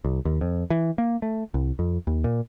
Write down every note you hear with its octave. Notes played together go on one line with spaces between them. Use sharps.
C2
D#2
F2
E3
A#3
A3
C2
F2
D#2
A#2